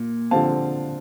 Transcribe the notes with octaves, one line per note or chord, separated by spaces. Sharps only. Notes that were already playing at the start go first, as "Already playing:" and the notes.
Already playing: A#2
D3 F3 C4 F5 A5